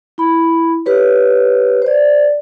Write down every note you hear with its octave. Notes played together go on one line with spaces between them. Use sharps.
E4 B5
G4 B4 C#5
C5 D5